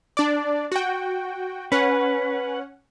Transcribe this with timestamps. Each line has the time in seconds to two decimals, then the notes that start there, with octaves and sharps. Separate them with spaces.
0.17 D4 D5
0.72 F#4 G5
1.72 C#4 B4 F#5